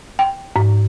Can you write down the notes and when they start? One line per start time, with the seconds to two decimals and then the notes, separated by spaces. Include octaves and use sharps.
0.19 G5
0.56 G#2